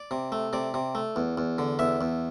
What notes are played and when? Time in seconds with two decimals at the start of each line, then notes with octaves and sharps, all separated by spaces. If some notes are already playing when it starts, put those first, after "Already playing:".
Already playing: D5
0.11 C3
0.32 A3
0.53 C3 D5
0.74 C3
0.95 A3
1.16 E2
1.37 E2
1.58 D3
1.79 E2 E5
2.01 E2